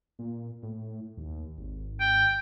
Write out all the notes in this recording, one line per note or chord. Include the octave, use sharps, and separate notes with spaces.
A#2
A2
D#2
G#1
G5